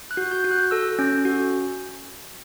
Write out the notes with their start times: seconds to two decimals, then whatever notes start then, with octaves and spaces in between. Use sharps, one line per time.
0.11 F#6
0.17 F#4
0.32 G6
0.44 F#4
0.51 F#6
0.71 A4 E6
0.99 C#4
1.25 F#4